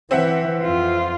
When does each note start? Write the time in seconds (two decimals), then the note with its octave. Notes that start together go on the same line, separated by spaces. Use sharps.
0.11 E3 C4 E5 F#5
0.63 F2 F4